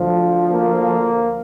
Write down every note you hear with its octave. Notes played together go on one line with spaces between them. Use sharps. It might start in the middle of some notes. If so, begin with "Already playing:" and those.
Already playing: D2 D3 F3
A#3